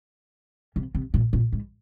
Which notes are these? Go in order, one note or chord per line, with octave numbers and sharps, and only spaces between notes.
C3
C3
A#2
A#2
G#2